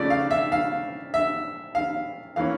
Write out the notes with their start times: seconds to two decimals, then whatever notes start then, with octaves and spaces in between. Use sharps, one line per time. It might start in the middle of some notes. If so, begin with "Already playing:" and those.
Already playing: C#3 F3 A3 D5
0.10 F5
0.31 E5
0.52 F5
1.14 E5
1.75 F5
2.36 E3 A#3 C#4 F5